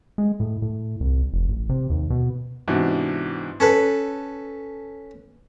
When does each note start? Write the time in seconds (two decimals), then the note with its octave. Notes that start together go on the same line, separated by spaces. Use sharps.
0.18 G#3
0.40 A2
0.62 A2
1.00 C2
1.32 F1
1.48 A1
1.69 C3
1.90 D#2
2.10 B2
2.68 G#2 C3 E3 B3 D4 F#4
3.60 C#4 A4 B4